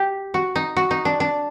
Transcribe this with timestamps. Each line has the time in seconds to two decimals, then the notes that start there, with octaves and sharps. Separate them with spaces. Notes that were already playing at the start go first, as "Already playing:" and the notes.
Already playing: G4
0.34 F#4
0.56 D#4
0.77 F#4
0.91 D#4
1.05 D4
1.20 D4